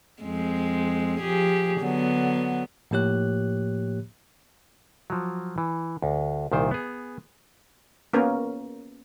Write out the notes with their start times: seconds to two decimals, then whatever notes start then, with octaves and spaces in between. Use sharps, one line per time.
0.21 F2 G#3 C4
1.20 F3 G4 G#4
1.80 D3 F#3 B3
2.91 A2 F3 A#3 G4 C#5 F#6
5.10 F3 F#3
5.58 E3
6.02 D2
6.52 C2 A#2 D#3 C5
6.71 B3 G#4
8.13 A#3 B3 C#4 A#4